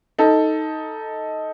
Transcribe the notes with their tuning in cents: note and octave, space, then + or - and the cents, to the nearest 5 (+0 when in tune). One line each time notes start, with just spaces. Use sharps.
D#4 +15 A4 +0